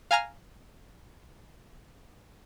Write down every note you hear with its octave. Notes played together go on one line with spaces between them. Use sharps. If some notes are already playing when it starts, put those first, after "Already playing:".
F5 G#5 A#5 F6